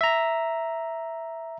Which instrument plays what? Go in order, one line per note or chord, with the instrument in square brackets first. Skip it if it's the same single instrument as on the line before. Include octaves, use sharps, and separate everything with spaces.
[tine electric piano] E5 A#5